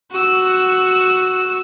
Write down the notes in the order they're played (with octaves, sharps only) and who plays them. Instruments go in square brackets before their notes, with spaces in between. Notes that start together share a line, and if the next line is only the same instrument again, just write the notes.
[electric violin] F#4 E6